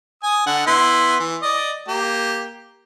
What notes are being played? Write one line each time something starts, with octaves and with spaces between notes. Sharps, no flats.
G#5 D#6
D3 F#5
B3 E4 C6
E3
D5 D#5
A#3 G4